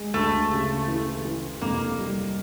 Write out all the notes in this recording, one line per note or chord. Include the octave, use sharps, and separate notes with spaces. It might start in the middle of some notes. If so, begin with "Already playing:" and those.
Already playing: G#3
D2 A3
C#3
E3
E3
F1 A#3
G3